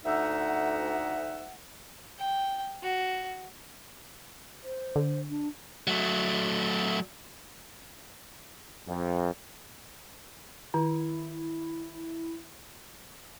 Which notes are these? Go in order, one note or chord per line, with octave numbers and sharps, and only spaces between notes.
D2 D#4 E5 F#5
G5
F#4
C5
D3
D4
F#3 A3
F2
D#3 E4